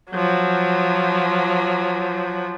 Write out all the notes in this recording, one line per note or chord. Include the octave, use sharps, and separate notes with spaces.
F3 F#3